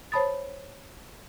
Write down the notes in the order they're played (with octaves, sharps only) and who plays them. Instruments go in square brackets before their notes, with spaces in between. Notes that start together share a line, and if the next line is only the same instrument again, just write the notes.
[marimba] C5 C#5 A5 B5 D#6 A6